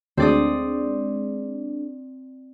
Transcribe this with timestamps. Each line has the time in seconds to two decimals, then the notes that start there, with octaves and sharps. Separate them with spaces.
0.17 D2 G#3 C4 D4 D5 D#6